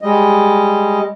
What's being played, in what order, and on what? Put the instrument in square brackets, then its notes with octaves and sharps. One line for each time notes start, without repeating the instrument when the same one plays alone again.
[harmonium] G3 G#3 D#5